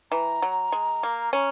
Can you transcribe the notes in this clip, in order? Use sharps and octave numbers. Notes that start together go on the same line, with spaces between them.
E3 A#5
F#3
G#3
A#3
C#4 A#5